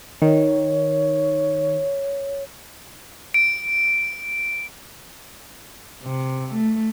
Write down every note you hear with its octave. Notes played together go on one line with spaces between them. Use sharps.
D#3 C#5
D7
C3
A3